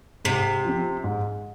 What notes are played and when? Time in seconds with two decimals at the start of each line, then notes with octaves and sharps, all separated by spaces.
0.25 G#2 C3
0.65 F3 C4
1.04 G#2